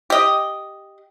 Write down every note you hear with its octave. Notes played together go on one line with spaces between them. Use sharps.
G4 D#5